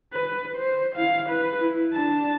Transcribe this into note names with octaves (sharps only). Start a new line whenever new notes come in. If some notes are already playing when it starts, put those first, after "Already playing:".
B4
C5
E4 F5
B4
E4
D4 A5